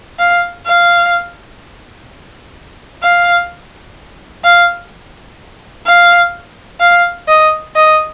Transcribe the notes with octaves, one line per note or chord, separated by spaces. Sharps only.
F5
F5
F5
F5
F5
F5
D#5
D#5